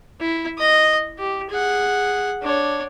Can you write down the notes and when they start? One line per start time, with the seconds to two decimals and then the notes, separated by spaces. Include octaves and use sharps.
0.20 E4
0.58 D#5 D#6
1.18 G4
1.50 G#4 F#5
2.42 D4 C#5